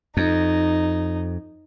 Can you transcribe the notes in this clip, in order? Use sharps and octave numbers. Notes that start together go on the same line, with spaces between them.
F2 D#4